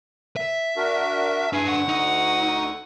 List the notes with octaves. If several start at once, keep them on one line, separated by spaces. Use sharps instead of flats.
E5
D4 F#4 A#4
D4 E4 G#4 B4
D2 D3 F#5 C#6
D#4